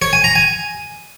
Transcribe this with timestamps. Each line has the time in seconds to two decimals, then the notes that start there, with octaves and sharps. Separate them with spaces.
0.02 C#5
0.13 G#5
0.24 A#5
0.35 G#5